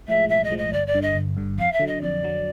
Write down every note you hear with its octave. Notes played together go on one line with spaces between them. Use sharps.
A2 F3 G#3 E5
B1 E5
D#5
A2 F3 G#3
D#5
G1 D5
D5
G2 D3
D#5
G1
G2 D3
F2 F5
E5
D3 F#3
D#5
F2 D5
D3 F#3